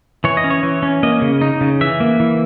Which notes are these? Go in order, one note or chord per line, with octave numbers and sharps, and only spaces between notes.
E3 C#5
D#5
C#4
C#5
E3
C#4
A#3 D#5
C#3
D#4
C#3
E3 E5
A#3
E3